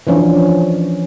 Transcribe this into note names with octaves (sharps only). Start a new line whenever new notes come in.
E3 F3 C#4 D4